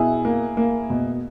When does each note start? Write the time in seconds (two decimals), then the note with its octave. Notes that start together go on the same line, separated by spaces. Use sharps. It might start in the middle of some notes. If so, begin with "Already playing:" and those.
Already playing: B2 E4 G#4
0.25 A#3
0.57 A#3
0.90 B2